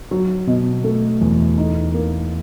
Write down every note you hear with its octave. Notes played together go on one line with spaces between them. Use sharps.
F#3
B2
A3
E2
D#4
A#3